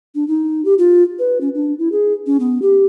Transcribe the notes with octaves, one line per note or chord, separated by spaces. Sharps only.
D4
D#4
G4
F4
B4
C#4
D4
E4
G#4
C#4
B3
G4